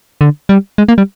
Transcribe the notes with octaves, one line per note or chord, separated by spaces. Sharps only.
D3
G3
G#3
A#3
G3